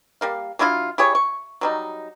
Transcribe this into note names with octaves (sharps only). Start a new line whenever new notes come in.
G3 A#3 F5
F#3 D4 E4 F4
E4 G4 G#4 C#5
C#6
F#3 G3 D#4